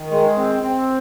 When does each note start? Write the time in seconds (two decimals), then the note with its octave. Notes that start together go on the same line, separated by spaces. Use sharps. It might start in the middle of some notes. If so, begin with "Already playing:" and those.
Already playing: D#3
0.11 G#3
0.37 C4
0.63 C4